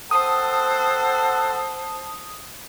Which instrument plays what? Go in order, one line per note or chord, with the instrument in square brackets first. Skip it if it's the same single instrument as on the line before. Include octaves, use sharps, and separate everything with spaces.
[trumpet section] C4 A4 F#5 [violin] C5 [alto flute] A5 [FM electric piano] D#6